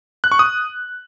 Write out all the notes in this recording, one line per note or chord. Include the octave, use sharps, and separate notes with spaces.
F#6
C#6
D#6